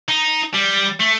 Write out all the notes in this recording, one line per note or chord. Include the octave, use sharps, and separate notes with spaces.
D#4
G3
A3